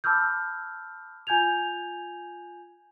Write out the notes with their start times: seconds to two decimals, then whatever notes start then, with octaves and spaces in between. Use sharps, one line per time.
0.04 A5 B5 D6 E6 F6 G6
1.27 F4 G#5 G6 G#6 F7